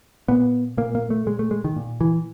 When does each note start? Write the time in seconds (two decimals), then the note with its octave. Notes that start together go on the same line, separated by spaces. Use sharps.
0.28 A#2 B3
0.77 A#2 A#3
0.95 A#3
1.10 A3
1.26 A#2 G#3
1.39 A3
1.51 G#3
1.64 D#3
1.76 A#2
2.01 E3